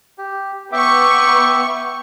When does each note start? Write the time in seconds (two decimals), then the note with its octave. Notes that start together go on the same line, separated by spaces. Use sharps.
0.18 G4
0.72 B3 E5 G5 C#6 D6